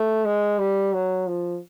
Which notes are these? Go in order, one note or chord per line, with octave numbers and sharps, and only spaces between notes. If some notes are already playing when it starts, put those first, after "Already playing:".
Already playing: A3
G#3
G3
F#3
F3